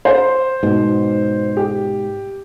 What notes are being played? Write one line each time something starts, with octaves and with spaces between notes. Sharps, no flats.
C5
G#2 B2
G4